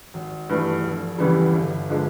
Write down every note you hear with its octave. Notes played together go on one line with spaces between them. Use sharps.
G#1
G2 E3 A3
F1
E2 C#3 E3 G3
G1
D3 F3 G#3